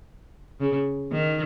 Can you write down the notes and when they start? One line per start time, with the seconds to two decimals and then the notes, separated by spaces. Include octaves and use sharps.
0.60 C#3
1.12 D#3